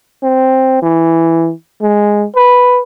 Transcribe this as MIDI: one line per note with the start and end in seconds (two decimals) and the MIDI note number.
0.23 0.80 60
0.82 1.51 52
1.81 2.25 56
2.35 2.80 71